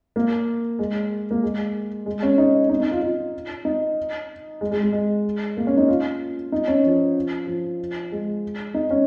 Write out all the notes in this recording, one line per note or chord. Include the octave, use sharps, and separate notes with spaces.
A#3
G#3
A#3
G#3
G#3
C#4
D#4
D#4
D#4
F4
F4
D#4
G#3
G#3
G#3
G#3
A#3
C#4
D#4
F4
D#4
C#4
F3
F3
G#3
D#4
C#4